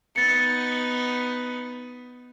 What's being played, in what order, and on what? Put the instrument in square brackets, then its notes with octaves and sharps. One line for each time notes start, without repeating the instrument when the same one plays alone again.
[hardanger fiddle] B3 D#4 [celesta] A6 C#7